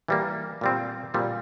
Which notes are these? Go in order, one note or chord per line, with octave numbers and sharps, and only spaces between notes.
E3 G3 A#3
A#2 G3 C4
A#2 G3 C4